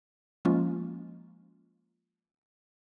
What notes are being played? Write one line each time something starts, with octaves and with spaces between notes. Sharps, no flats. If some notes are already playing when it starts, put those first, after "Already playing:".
F3 G#3 A#3 C#4 F4